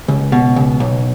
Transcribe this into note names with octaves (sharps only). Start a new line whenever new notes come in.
C#2
B2
C#2
B1